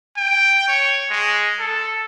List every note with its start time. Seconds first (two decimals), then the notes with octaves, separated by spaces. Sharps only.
0.17 G5
0.68 C#5
1.11 G#3
1.59 A4